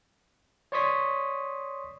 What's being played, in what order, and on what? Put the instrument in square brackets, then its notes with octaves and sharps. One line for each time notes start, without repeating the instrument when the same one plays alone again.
[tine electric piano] C#5 D5 C6 C#6 D#6 B6